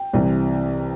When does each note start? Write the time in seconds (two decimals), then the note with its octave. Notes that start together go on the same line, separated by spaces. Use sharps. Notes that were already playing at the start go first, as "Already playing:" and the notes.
Already playing: G5
0.13 C2 C3 E3